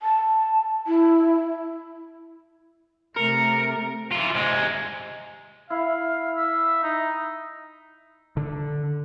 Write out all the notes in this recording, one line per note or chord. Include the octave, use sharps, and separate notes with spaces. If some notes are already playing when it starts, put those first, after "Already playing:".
A5
E4
C3 A3 A#4 C#7
E3 F4
C3 G#3
E4 F5
E5
D#4
D3